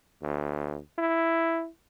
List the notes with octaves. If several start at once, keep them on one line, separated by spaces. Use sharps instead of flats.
D2
E4